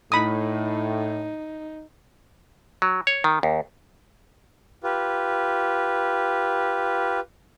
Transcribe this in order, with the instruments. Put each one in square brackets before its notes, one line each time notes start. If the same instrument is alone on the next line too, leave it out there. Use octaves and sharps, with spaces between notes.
[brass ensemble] A2 [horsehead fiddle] D#4 [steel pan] B5 D#6
[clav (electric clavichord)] F#3
C#5
D#3
D#2
[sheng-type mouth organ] F4 G4 B4